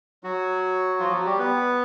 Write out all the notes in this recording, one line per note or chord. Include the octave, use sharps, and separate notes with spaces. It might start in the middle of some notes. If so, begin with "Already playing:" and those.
F#3 F#4
F3 F4
F#3 F#4
G3 G4
B3 B4